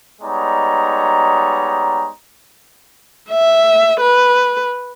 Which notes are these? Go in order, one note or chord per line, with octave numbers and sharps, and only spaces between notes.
G3 G#3 B3 D#4 C#5 A#5
E5
B4